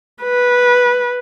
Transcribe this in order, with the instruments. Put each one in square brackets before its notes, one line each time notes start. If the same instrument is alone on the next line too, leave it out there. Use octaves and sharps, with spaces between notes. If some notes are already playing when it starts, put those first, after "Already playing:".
[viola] B4